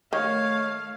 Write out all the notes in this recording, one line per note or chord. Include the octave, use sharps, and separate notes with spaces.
D#3 A3 C#5 F5